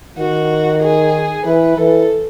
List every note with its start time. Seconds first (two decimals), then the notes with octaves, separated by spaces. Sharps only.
0.18 D#3 F#4
0.82 G#4
1.45 E3 B4
1.77 E3 A4